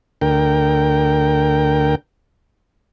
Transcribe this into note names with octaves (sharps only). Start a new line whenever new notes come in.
D2 A#4 G5